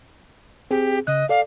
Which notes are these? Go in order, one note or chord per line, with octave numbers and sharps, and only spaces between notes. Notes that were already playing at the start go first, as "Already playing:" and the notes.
C4 G4 G#4
C#3 D#5 F#6
A4 D5 F5